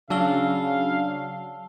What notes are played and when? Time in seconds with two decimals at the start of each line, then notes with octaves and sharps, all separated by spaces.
0.10 C#3 F#3 D4 F#4 F5 A5 E6 G7